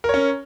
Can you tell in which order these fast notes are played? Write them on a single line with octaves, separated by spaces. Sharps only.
A#4 C#5 C#4